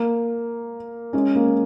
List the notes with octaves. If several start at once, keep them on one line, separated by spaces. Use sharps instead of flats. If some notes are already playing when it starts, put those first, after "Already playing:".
Already playing: A#3
G#3 C#4
A#3